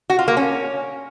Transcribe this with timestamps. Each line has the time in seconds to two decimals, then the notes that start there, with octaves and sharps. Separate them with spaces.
0.10 F#4
0.19 F4
0.28 A#3
0.37 C#4